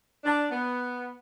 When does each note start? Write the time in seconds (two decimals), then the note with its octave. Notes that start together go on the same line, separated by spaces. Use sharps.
0.24 D4
0.51 B3